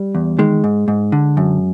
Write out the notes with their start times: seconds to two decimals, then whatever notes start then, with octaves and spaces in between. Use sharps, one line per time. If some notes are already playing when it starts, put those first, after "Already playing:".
Already playing: G3
0.15 E2
0.39 D#3 G#3
0.64 G#2
0.88 G#2
1.12 D3
1.37 F#2